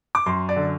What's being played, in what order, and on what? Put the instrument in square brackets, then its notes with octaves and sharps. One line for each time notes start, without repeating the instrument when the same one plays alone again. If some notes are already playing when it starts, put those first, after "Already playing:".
[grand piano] D6
F#2 C6
D5
D3